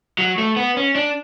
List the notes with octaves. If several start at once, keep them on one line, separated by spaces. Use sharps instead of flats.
F#3
A3
B3
C#4
D4